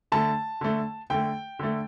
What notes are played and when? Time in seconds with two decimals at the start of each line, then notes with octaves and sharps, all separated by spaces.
0.12 D3 A3 A5
0.61 D3 A3
1.10 D3 A3 G5
1.59 D3 A3